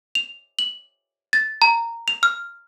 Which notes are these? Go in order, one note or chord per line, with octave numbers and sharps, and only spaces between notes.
F7
F#7
A6
A#5
F7
F6